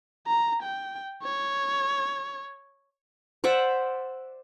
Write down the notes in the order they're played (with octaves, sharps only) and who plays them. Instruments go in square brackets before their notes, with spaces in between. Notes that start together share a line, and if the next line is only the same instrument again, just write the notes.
[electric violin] A#5
G5
C#5
[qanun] C5 D5 E5 F#5